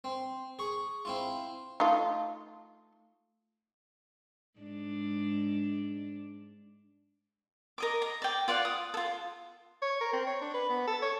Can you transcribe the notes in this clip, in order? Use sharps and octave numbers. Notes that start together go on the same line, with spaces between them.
C4
G#4 C#6
C4 E4 F4
A3 D#4 F4
G#2 D4
A#4 D#5 D6
A#5
D5 G5
F4 D5 F5 F#5
D#6
F4 A4
C#5
A#4
C4
C#5
D4
B4
B3
A4
C#5